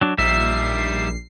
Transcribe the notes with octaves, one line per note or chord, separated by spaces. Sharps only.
F#3 D4
A#1 G3 D#4 E5 C7